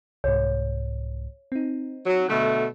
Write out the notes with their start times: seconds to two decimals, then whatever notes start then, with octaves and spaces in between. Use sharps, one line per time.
0.24 C2 G#2 C#5
1.52 C4 D#4
2.06 F#3
2.28 B2 D3 A3 F#6